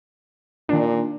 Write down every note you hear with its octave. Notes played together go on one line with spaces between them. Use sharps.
A#2 D#3 D4